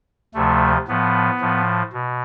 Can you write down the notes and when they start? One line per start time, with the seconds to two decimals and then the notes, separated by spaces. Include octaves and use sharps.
0.34 D2 C3 F3 A3
0.88 A2 F3 B3
1.41 A2 F3
1.93 B2